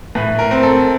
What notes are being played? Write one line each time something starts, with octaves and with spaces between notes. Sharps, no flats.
A2 B4
A#4
C4
A4